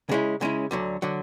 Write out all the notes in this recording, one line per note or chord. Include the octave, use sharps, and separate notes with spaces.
C#3 G#3 C#4 E4
C#3 G#3 C#4 E4
D2 D3 F#3
D3 F#3